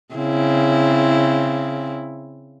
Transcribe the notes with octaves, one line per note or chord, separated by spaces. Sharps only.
C#3 C4 E4